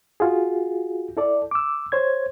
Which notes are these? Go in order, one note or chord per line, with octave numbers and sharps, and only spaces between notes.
F4 F#4 G#4
E4 A4 D5
D6 E6
C5 C#5 G#6